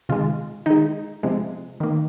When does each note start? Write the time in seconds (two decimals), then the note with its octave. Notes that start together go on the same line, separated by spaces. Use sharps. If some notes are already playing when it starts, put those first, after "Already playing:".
0.09 C3 D#3 G#3 F4
0.66 D#3 G#3 D#4
1.23 C3 F3 G#3
1.80 D#3 A#3